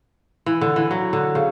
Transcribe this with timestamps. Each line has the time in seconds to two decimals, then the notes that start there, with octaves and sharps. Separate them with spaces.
0.46 E3
0.61 D3
0.76 E3
0.91 F#3
1.13 D3
1.35 C#3